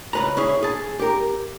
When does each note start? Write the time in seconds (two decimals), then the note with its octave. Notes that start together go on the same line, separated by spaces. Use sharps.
0.13 C#2 B4 A#5
0.37 C#4 E4 G#4
0.63 G#4 A5
0.99 G4 A#4